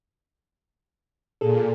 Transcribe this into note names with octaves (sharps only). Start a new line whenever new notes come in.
A#2 G#4 A4